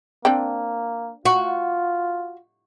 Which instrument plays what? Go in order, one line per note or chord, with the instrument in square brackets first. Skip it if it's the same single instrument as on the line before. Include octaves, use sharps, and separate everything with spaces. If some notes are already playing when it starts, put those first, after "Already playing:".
[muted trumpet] A#3 [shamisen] C4 D4 G5
[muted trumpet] F4 [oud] F#4